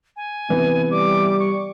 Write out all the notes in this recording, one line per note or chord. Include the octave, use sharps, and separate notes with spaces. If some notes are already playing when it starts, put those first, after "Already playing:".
G#5
C3 E3 B3
G3 D6
C#6